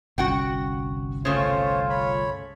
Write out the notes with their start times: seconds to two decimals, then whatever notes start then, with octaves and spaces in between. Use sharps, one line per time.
0.18 G1 C2 C#4 F#4 F#5 G5
1.25 C#3 A3 F4 C5 C#5
1.90 C#5 B5